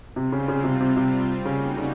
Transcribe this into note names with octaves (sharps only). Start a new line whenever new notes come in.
C3 G3 C4 F4
C#3
C#3
C3
C3
C3
C#3 G3 A#3 D#4 F#4
C#3